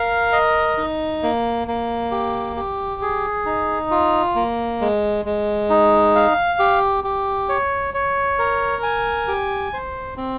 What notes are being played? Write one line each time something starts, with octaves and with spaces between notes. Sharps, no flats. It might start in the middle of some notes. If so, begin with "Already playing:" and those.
Already playing: A#4 F5
D#5
D#4
A#3
A#3
G4
G4
G#4
D#4
F4
A#3
G#3
G#3
D#4
F5
G4
G4
C#5
C#5
A#4
G#5
G4
C5
C4